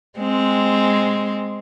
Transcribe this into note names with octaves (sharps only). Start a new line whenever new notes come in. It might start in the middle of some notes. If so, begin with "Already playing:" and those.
G#3 C4